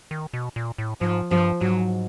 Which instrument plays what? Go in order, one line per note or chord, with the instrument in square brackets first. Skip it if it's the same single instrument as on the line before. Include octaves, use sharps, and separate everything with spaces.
[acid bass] D#3
B2
A#2
A2
[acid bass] G#2 [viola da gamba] F3
[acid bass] G2 [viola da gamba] F3
[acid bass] G#2 [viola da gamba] F#3